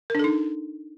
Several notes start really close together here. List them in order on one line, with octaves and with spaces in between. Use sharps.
A#4 D4 A4 D#4